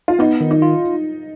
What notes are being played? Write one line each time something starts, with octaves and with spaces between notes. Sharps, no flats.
F4
B3 D#4
D#3
D#4
F4